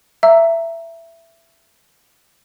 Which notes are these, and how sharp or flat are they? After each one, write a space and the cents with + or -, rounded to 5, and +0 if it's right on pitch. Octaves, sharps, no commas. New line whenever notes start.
E5 +15 A#5 -10 E6 +0